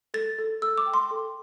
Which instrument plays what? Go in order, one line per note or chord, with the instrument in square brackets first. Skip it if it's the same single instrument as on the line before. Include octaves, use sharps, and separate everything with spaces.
[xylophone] A4 A6
A4
A4 E6
D6
G5
C6
A4